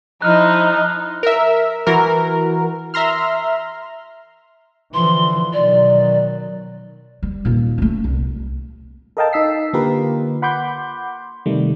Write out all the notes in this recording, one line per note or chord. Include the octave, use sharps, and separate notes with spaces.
F3 D#4 E4 D#5 C6 F6 F#6
A#4 E5
E3 F#4 A#4
E5 A#5 C6 F6
D3 E3 F3 C6
B2 D#3 F#3 D5
G3
D#1 A#2
A3 C#4
C2
A4 A#4 D#5 F5 G5 A5
D#4 D#5 E6 B6 C7
D3 A#3 F4 G4 A#4 B4
F#5 B5 C6 D6 G6
C3 D#3 G3 A3